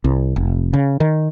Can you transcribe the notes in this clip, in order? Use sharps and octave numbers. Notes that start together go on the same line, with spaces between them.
C2
F1
C#3
D#3